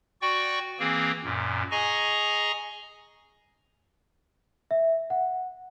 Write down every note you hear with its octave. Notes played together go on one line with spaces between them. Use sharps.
F#4 D5 G5 C#6
E3 A#3 C4 G#4
F#2 A#2
G#4 D#5 G#5 A#5 C#6
E5
F#5